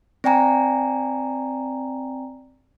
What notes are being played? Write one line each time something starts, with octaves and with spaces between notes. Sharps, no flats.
C4 D5 G5 G#5 A#5